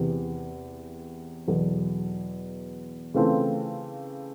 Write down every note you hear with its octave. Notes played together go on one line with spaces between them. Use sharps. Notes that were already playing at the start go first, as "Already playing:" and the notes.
Already playing: E2 C3 E3
E2 B2 F#3
C#3 E3 A3 C4 F4